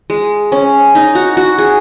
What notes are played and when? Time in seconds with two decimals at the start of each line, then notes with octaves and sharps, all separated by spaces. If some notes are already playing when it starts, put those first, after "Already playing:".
0.10 G#3
0.52 C#4
0.95 D#4
1.15 F#4
1.37 F#4
1.58 G#4